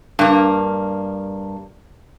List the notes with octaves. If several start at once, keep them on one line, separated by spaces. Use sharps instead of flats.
G2 A#3